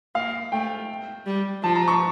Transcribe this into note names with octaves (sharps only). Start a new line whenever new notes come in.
A#3 F5
A3 G5
G3
F3 A5
A#5
C#6